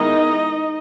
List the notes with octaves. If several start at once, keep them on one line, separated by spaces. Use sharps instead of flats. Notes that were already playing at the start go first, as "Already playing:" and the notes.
Already playing: D#3 G#3 B3 D#4 E4 D#5